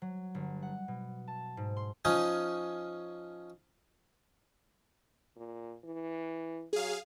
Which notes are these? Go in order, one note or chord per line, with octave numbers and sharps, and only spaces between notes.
F#3
G1
F#5
B2
A5
G#2
C6
F3 C#4 D#4
A#2
E3
F#3 G#4 F5